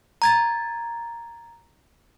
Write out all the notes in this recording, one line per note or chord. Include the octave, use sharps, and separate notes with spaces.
A#5 G#6 A6